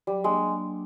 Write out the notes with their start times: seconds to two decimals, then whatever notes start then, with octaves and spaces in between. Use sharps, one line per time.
0.07 F#3 G3
0.24 G#3 A#3 D4